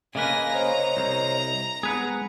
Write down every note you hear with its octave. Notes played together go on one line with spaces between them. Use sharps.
C#3 A#3 B4 D#5 G#5 A#6
C5 C#5 D#5 A#5
C2
G#3 B3 G#4 B4 F#5